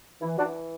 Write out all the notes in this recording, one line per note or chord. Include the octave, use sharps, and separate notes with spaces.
E3 E4
D4 F#4
E3